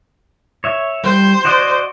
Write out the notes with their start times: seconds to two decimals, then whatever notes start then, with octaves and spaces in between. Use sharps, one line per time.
0.64 C#5 E5
1.04 G3 C5
1.45 F#4 D5 D#5